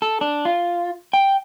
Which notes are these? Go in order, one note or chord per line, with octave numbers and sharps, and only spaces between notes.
A4
D4
F4
G5